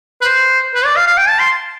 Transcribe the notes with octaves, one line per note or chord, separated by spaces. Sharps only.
B4
C5
B4
D5
F5
F5
G5
A5
C6